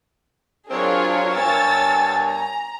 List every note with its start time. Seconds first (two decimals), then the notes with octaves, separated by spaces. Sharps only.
0.70 F#3 C4 D4 F4 G#4 A#4 C#5
1.33 G2 B3 G#5 E6 A6
2.25 A#5